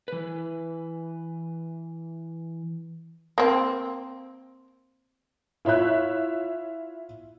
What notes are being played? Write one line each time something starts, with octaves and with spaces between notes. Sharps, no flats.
E3 B4
A#3 C4
E4 F4 C#5 E5 F#6